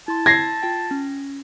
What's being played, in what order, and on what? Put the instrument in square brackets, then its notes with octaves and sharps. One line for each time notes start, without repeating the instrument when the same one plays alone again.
[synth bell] E4 C6 [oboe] A5
[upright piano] G#6 A#6 C7
[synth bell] F4 G5
C#4